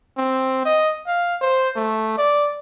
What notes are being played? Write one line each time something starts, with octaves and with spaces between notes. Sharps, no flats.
C4
D#5
F5
C5
A3
D5